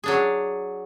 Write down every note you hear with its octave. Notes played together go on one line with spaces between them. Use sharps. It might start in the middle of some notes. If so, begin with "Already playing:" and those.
F#3 D4 G#4